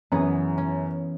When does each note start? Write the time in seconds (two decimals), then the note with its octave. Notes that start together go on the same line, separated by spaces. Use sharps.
0.12 F#2 E3 B3 G#4
0.58 C#4